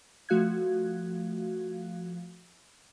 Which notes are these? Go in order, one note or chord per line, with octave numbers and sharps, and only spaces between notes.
F3 A3 F#4 F5 F#6 G#6